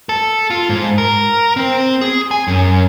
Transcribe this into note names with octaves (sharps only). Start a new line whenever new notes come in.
A4
F4
G#2
A#4
C4
G#4
G#5
F#2